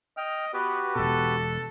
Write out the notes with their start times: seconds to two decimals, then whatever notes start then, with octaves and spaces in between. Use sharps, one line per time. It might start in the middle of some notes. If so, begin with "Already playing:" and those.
0.17 D#5 G5 F6
0.53 B3 F#4 G4 B4
0.95 E1 B2 A4